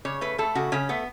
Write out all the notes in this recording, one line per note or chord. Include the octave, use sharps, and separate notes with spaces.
C#3 C#5
A3 B4
A3 A4
C#3 F#4
C#3 C#4
A3 B3